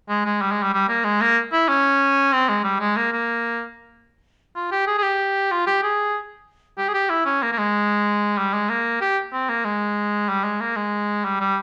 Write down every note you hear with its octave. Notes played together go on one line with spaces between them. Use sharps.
G#3
G#3
G3
G#3
G3
G3
A#3
G#3
A#3
E4
C#4
C4
G#3
G3
G#3
A#3
A#3
F4
G4
G#4
G#4
G4
F4
G4
G#4
G4
G#4
G4
E4
C#4
A#3
A#3
G#3
G3
G#3
A#3
G4
C4
A#3
G#3
G3
G#3
A#3
G#3
G3
G3